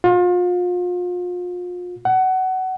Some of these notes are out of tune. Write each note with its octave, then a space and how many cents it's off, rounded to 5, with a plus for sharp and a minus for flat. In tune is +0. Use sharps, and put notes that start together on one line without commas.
F4 +35
F#5 +20